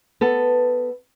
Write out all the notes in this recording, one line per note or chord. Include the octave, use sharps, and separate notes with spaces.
B3 A4